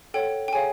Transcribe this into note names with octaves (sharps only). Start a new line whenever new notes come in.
A4 C#5 F#5 G5
G5
G#4 C#5 F5 G#5